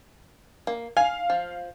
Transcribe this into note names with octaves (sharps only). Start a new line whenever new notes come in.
A#3
F5 G#5
F3